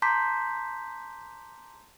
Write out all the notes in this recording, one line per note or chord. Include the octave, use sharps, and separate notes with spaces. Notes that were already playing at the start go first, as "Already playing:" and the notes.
A5 A#5 C6 D6 G6 B6